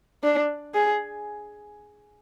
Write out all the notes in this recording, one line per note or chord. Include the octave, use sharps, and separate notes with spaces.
D4
G#4